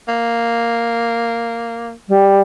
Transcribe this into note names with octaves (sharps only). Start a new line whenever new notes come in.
A#3
G3